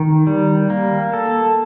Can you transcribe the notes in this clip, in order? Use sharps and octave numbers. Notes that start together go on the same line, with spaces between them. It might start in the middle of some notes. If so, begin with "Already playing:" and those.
Already playing: D#3
G3
A#3
A4